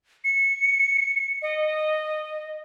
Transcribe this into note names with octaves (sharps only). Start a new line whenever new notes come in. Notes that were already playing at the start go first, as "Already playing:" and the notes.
C#7
D#5